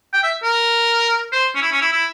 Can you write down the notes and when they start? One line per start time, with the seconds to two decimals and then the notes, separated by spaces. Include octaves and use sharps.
0.13 G5
0.23 E5
0.43 A#4
1.32 C5
1.55 C#4
1.61 E4
1.72 C#4
1.81 E4
1.92 E4